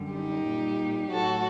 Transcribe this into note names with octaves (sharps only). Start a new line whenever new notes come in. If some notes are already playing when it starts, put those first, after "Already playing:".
Already playing: F#2 D3 G3
D#4 G4
A#2 G3
A2 F#3 F#4 A4